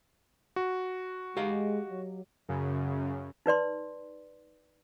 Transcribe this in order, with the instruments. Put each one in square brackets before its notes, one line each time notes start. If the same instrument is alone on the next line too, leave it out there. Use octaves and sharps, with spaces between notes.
[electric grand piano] F#4
[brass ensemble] G#3 [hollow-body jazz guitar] G4 D#5 F5
[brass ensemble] F#3
[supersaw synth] F#2 C#3
[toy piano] D#4 B4 D5 C6